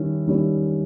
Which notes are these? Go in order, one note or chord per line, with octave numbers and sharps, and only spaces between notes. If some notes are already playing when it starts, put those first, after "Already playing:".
Already playing: D#3 G3 C#4 E4
D#3 G3 C#4 E4